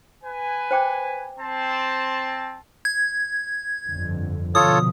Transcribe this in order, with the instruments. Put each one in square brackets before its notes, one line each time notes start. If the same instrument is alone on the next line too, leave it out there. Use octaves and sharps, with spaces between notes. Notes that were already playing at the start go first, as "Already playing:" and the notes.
[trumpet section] B4 G#5
[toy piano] C5 G5 D6
[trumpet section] C4 A5
[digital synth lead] G#6
[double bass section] G1 F2 D3
[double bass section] B2 D3 F3 [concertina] F4 A4 C#5 [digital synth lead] D#6